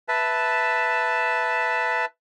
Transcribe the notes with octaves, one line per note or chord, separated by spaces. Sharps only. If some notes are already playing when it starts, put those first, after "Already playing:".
B4 E5 A5